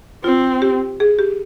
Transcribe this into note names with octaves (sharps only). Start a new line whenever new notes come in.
C4 F4
G4
G#4
G4